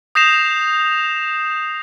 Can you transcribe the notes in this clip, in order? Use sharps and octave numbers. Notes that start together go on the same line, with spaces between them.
D#6 G6 A#6 C7 E7 F7